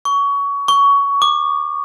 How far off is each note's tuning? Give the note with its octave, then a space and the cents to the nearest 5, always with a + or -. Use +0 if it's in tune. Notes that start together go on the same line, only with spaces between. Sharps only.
C#6 +25
C#6 +20
D6 +35